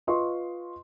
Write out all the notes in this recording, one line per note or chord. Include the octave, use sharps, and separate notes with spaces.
F4 B4 D#5 C6 C#6